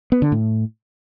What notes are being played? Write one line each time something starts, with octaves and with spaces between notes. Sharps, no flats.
B3
D3
A2